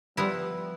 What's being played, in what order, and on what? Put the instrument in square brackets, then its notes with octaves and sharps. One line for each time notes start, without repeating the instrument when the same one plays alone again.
[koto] F3 B3 E4 [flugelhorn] G3